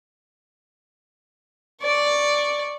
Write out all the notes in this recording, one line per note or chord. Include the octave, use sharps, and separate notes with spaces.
D5 C#6